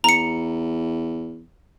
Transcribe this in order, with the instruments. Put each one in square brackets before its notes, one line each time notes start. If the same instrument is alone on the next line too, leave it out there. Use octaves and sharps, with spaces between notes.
[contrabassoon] E2 [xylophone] A#5 C#7